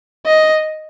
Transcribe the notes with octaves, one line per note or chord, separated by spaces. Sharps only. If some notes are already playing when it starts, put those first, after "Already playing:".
D#5